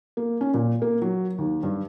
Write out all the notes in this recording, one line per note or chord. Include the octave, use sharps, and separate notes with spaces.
A#3
C#4
A#2
A#3
F#3
D#2
G2